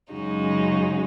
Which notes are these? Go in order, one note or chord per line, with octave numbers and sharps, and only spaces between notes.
F#2 C#3 G#3 D#4 F#4